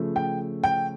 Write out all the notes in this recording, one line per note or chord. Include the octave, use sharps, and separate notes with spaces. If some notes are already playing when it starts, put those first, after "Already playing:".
Already playing: C#3 F3 A3
G5
G5